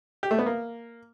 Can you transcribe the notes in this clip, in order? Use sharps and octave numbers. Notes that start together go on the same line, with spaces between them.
G4
A3
B3
A#3